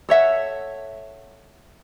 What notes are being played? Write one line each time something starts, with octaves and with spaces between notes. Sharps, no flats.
A4 C#5 E5 F#5